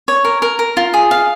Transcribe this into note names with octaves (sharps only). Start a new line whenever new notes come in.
C#5
A#4
A#4
A#4
F4
G#4
F5